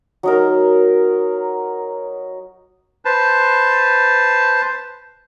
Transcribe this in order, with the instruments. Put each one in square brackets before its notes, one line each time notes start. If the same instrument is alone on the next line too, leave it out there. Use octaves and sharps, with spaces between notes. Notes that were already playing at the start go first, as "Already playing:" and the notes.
[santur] F#3 D#4 A#4
[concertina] B4 C5 A5